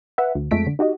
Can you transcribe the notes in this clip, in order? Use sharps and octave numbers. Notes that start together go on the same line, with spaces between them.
B4 E5 F#5
D2
F2 G#3 A3 B6 D7
D3
D#4 F#4 G4 D#5